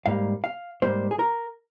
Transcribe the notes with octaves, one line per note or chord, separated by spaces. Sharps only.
G#2 G3 A#3 F5
F5
G#2 G3 A#3 C5
G#4
A#4